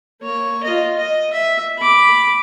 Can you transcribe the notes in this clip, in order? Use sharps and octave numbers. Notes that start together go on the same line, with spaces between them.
A#3 C#5
F4 D#5
D#5
E5
B5 D6